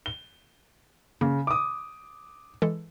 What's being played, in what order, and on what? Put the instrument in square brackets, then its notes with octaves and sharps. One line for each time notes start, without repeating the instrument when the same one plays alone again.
[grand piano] G7
[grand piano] C#3 [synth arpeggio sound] A#3
[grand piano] D6 D#6
[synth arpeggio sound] E3 G#3 A4